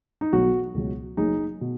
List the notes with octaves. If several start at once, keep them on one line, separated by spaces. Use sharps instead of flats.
D#4
B1 B2 F#3 F#4
C#2 B2 F#3
F#1 F#2 F#3 D#4 G#4
B2